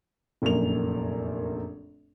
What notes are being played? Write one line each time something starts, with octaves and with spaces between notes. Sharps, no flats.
F1 A#1 F#2 A#3 F7